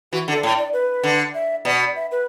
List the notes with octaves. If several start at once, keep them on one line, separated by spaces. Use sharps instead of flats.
E3 F#4
D3
A4
A2
D5
B4
D3
E5
B2 D5
E5
B4